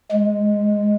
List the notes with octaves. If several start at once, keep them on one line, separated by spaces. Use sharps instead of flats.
G#3